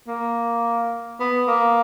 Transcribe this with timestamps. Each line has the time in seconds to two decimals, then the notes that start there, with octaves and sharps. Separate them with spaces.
0.08 A#3
1.20 B3
1.48 A#3